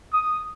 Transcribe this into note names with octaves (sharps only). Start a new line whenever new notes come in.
D#6